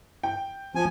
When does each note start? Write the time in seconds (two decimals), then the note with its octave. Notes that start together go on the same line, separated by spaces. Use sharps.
0.23 G5
0.75 F3 G#5